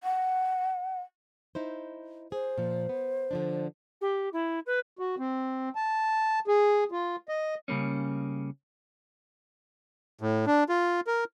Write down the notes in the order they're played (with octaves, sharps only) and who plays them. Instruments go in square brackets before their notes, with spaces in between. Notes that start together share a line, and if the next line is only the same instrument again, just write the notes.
[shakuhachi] F#5
[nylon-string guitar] D#4 E4 C5
[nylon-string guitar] G#4 [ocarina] C5
[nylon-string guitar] A#2 F3
B3
D3 F3 D4
[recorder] G4
E4
B4
[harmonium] F#4
C4
A5
G#4
F4
D#5
[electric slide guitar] C#3 G3 A#3 C#4
[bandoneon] A2
D4
F4
A#4